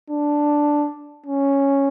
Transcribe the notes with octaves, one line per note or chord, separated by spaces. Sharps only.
D4
C#4